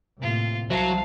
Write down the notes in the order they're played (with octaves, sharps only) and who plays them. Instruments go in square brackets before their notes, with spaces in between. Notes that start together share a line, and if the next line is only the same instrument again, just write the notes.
[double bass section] A2 C3 A#3 [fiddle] F4
[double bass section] C2 [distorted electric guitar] F#3 [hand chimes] C5 E5 A5 [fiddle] F5